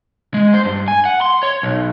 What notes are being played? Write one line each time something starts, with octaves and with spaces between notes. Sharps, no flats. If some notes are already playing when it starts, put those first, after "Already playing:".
G#3
C5
G2
G#5
F#5
C6
C#5
B1